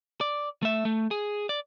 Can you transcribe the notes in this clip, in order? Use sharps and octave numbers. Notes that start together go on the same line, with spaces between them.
D5
A3 E5
A3
G#4
D5